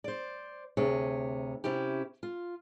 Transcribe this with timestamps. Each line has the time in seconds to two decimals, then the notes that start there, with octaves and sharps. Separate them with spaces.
0.04 C5 D5
0.77 D2 C3 G#4 C#5
1.64 C3 C#4 E4 G4
2.23 F4